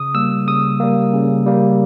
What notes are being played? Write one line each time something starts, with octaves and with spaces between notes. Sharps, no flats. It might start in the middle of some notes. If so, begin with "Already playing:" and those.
Already playing: C#3 D#6
G3 A#3 E6
C#3 D#6
G3 A#3
C#3
G3 A#3